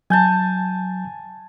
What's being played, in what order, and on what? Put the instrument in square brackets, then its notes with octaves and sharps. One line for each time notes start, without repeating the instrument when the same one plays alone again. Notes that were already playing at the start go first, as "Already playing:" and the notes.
[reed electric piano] F#3 G6 [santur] G#5 A5